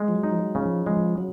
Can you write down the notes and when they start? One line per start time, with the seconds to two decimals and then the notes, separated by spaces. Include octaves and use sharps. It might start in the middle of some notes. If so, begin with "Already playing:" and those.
Already playing: G#3
0.08 F3
0.16 F#3
0.23 D#4
0.31 F3
0.39 F#3
0.55 C#3
0.63 F3
0.86 F3 G#3
1.18 F#3